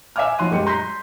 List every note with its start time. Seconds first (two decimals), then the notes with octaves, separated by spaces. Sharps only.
0.16 E5 F5 G#5 D6 F6
0.38 F3 F#3 D#4 C6 F#6 D#7
0.51 F#2 G#3 G4 D#5 C#7
0.66 A#5 C6 G6 A#6 B6